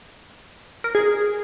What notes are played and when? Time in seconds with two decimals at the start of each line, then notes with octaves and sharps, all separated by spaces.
0.84 A#4
0.95 G#4